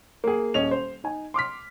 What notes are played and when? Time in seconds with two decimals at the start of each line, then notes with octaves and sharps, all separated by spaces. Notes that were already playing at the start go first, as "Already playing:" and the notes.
0.24 A#3 G#4
0.54 D#1 C#4 D#5 F7
0.71 C5
1.04 D#4 G#5
1.34 C6 D6 F6 B6